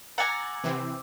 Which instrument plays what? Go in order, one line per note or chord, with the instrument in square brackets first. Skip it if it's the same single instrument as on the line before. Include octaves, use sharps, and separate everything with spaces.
[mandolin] F#5 G#5 [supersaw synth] A#5 A6 [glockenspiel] D6 E6
[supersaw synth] C3 E3 C4